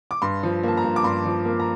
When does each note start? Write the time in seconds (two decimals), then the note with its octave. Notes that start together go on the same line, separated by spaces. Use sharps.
0.11 D6
0.22 G2 C6
0.43 F3
0.63 A#3 A5
0.77 A#5
0.84 G2
0.96 D6
1.04 G2 C6
1.26 F3
1.45 A#3
1.60 A#5